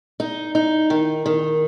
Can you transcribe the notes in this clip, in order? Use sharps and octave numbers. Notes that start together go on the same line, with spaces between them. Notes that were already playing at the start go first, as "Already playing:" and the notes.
D#4
D#4
D#3
D#3